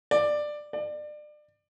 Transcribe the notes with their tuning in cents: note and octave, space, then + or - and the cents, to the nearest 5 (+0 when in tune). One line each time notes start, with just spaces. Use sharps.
D5 +15
D5 +30